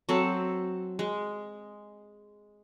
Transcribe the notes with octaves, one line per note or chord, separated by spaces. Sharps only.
F#3 C4 A4
G#3